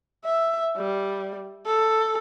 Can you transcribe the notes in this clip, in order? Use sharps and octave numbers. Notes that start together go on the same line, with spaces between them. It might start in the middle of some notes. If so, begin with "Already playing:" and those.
E5
G3
A4